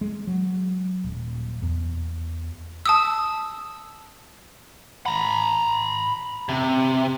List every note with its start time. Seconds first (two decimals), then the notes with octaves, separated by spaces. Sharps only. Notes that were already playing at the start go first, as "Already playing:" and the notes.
0.01 G#3
0.27 F#3
1.04 D#1
1.62 E2
2.86 A5 D#6 E6
5.06 A#5 B5
6.49 C3